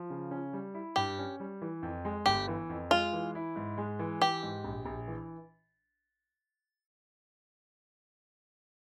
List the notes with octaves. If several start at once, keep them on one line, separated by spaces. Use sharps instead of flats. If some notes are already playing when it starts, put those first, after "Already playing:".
Already playing: F3
C#3
C#4
G3
E4
G2 G4
C#4
G3
E3
F2
G#3
G1 G4
E3
F2
G#3 F4
E3
E4
G#2
G#3
E3
E3 G4
G#2
A#1
A#1
E3